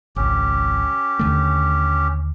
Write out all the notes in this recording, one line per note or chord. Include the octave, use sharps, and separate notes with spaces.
G#1 C#2 C#4 G4
D#2 D3 A3